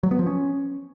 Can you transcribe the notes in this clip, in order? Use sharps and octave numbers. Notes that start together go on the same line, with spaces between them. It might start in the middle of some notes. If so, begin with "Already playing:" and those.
F#3
B3
F3
C#4